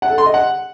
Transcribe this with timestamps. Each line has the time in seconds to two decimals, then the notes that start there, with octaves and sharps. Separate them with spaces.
0.02 F#5
0.10 A4
0.18 C6
0.26 D#5
0.34 F#5